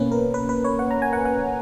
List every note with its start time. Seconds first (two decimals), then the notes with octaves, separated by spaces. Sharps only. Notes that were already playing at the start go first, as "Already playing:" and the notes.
Already playing: B2 A#3 C#4 B4
0.12 A#4
0.34 B4
0.49 B4
0.64 C#5
0.79 F#5
0.91 A#5
1.02 G#5
1.13 F#5
1.25 F#5